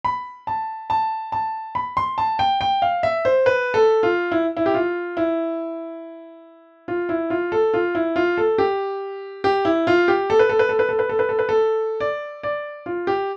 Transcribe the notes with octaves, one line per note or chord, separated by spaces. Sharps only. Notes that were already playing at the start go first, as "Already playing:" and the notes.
B5
A5
A5
A5
B5
C6
A5
G5
G5
F5
E5
C5
B4
A4
F4
E4
E4
G4
F4
E4
F4
E4
F4
A4
F4
E4
F4
A4
G4
G4
E4
F4
G4
A4
B4
A4
B4
A4
B4
A4
B4
A4
B4
A4
B4
A4
D5
D5
F4
G4